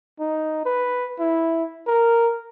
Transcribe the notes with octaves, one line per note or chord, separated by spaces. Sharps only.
D#4
B4
E4
A#4